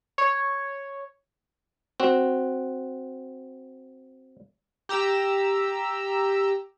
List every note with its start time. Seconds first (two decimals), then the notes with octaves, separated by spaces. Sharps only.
0.18 C#5
2.00 C4 F#4
4.89 G4 A#5 E6